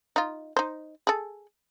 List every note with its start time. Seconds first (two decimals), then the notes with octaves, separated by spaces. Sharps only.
0.16 D#4 F4
0.56 D#4 C5
1.07 G#4 A4